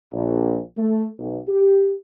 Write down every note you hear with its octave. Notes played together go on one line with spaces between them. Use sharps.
A#1
A3
B1
G4